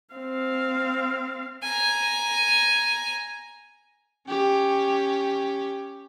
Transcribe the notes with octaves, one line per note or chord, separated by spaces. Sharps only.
C4 F5
G#5 A#5
C#4 G4